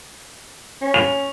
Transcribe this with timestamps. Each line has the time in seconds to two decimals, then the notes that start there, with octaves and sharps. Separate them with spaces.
0.82 C#4
0.94 F7